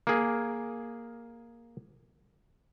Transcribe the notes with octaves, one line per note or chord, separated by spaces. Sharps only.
A#3 G#4